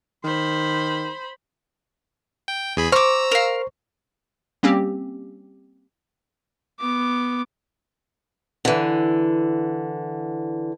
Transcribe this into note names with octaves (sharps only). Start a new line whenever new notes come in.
D#3 C5 B5
G5
E2 G#4 B5
C5 A#5 C#6 D6 E6 F6
A#4 F5
G3 A#3 C4 C#4 G4
B3 D6
D3 E3